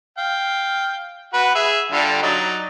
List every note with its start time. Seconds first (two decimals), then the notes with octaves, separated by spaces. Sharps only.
0.18 F5 G5
1.34 F#4 B4 F#5
1.55 G#4 E5
1.92 D3 G3 F4
2.22 F#3 D#4 D5